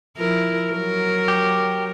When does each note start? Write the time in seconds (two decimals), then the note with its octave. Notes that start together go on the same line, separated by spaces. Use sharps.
0.18 F3 E4 A#4
0.69 F#3 A#4
1.28 G4